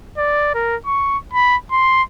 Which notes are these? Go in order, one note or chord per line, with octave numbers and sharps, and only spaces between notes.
D5
A#4
C#6
B5
C6